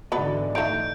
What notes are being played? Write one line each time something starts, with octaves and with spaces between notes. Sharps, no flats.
G#2 D3 E3 B3 F#4 B4 D5 D#5
A3 D#4 G6 D7